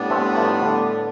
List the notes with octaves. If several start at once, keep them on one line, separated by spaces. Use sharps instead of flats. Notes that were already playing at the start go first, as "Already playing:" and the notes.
Already playing: A2 G3 B3 D4
A3 C4
F3 A3
D3